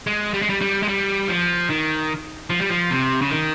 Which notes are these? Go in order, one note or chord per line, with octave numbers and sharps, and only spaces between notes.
G#3
G3
G#3
G3
G3
G#3
G3
F3
D#3
F3
G3
F3
C3
C#3
D#3